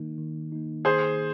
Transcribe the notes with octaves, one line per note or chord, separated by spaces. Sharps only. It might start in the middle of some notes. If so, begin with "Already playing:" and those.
Already playing: D#3 A#3 D#4
D#3
A#3 D#4
D#3 G#4 C5